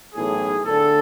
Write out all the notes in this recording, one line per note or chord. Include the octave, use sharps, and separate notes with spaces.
B1 A2 E3 G#4
D2 D3 A4